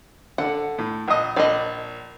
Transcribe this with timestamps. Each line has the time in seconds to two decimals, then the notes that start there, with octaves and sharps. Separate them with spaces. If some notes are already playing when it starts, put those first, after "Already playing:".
0.38 D3 F#5
0.78 A2
1.08 A#1 D#5
1.36 A#1 D5 D#5